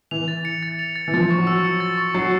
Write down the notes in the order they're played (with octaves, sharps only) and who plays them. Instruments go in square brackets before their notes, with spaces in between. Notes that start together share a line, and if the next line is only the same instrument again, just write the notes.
[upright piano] E3 [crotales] F7
[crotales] A6
C#7
A6
F7
A6
[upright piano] E3
[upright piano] F3 [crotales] A6
[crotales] C#6
[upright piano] F#3
[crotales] E6
C#7
A6
C#6
[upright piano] F#3 [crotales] C7